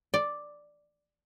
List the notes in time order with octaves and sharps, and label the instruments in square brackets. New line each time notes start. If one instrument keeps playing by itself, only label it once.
[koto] D5